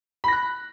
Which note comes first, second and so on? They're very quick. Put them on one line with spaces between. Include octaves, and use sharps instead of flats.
B5 A#6 F#6